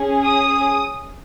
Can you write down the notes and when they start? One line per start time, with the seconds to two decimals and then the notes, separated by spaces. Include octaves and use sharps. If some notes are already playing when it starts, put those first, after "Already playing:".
Already playing: C#4 G#4
0.23 D#6